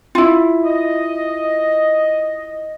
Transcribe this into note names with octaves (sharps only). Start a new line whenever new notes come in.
E4 F4
D#5